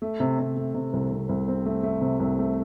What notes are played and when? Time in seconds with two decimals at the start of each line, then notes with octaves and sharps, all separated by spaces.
0.02 A3
0.20 C3
0.39 C3
0.56 A3
0.74 C3
0.93 C2
1.11 C3
1.29 C2
1.48 C4
1.66 A3
1.83 A3
2.01 C3
2.20 C2
2.39 A3